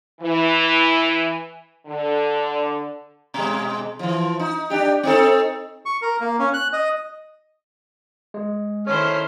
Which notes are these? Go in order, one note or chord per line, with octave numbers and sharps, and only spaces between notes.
E3
D3
B2 G#3
E3 F3
D#4
D4 G4
C4 D#4 A4
C#6
A#4
A#3
C#4
F#6
D#5
G#3
D#3 C#4 E4 A4 C5 C#5 F6